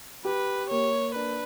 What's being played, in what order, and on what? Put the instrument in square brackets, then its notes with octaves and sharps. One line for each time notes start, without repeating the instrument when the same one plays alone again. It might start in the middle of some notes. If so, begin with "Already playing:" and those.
[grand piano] G4 [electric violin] B4
[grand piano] A#3 [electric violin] C#5
[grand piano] D4 [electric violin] B4